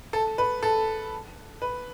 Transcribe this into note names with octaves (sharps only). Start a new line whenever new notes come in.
A4
B4
A4
B4